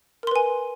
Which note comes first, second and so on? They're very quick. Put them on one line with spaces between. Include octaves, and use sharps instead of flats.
A#4 C6 B4 G#5